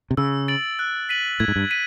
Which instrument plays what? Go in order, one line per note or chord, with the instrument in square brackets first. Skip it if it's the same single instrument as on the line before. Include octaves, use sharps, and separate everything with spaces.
[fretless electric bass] C3
[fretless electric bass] C#3 [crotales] E6
[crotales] A6 D7 F#7
F#6
B6 D#7 F#7
[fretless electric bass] A2 [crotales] G#6
[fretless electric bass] G#2
G2
[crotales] B6 D#7 F#7